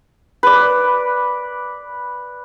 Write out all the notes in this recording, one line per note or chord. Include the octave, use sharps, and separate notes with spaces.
B4 D5